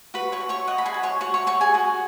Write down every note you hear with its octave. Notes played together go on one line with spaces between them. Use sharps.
F#4 B4 B5
C#5 C#6
F#4
C#5 C#6
D#5 F#5
B5
G#4 G#5
F#4
C#5 C#6
F#4 C#5 C#6
C#5 C#6
F#4 C#5 C#6
G#4 G#5
F#4 F#5